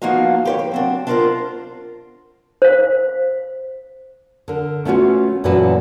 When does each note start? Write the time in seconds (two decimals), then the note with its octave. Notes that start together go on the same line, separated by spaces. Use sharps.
0.02 F3 A#3 B3 D#4 F#4 F5
0.45 G4 B4 C#5
0.59 G4
0.71 F#3 C4 D4
1.07 D4 E4 F4 A4 A#4 C5
2.62 C5 F5
4.48 D3 A#4
4.85 A3 B3 C#4 F4 F#4
5.44 F#2 A#2 E3 F#4 B4 A5